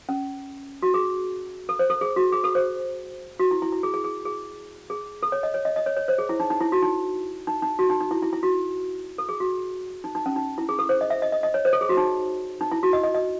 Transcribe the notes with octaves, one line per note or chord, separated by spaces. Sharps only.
C#4
F#4
G#4
A4
C5
A4
G#4
F#4
G#4
A4
C5
F#4
E4
E4
E4
G#4
G#4
G#4
G#4
G#4
A4
C#5
D#5
C#5
D#5
D#5
C#5
C#5
C5
G#4
E4
D#4
D#4
E4
F#4
D#4
D#4
D#4
F#4
D#4
D#4
E4
E4
E4
F#4
A4
G#4
F#4
D#4
D#4
C#4
D#4
E4
G#4
A4
C5
D#5
E5
D#5
D#5
D#5
C#5
C5
A4
G#4
F#4
D#4
D#4
E4
F#4
D#5
D#5
D#5